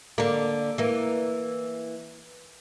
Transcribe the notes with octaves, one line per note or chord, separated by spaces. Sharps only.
D3 A#3
E3 A#3